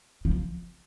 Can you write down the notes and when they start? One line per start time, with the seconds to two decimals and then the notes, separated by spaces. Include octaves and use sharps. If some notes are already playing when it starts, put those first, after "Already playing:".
0.25 F3